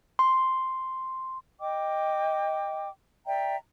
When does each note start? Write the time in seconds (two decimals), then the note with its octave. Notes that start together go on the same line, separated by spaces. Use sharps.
0.19 C6
1.60 D#5 G5 D6
3.26 D5 E5 G5 A#5